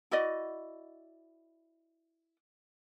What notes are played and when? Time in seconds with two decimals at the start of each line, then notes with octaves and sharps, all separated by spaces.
0.11 E4 F#4 D5 D#5